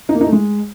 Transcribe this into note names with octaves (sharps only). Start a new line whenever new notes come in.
D#4
A#3
D#4
A3
G#3